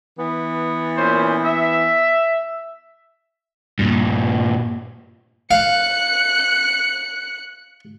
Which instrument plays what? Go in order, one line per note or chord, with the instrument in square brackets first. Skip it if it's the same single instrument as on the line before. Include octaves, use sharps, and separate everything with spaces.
[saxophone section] E3 B3
[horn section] A#2 C#4 C5
E5
[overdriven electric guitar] G2 A#2
[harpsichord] F5 [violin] F#6 C#7